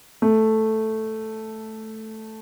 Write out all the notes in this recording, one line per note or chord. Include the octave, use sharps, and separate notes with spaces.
A3